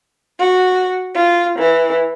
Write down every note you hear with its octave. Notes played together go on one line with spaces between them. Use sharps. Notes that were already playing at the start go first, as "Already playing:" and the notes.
F#4
F4
E3